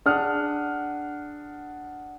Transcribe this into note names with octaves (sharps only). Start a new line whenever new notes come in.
D4 G#4 F#5 D#6 F6